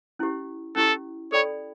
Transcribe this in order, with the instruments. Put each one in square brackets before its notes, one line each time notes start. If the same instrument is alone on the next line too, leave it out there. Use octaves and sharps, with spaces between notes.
[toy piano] C#4 E4 G4
[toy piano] C#4 E4 G4 [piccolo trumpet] A4
[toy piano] A4 D5 G5 B5 [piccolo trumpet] C#5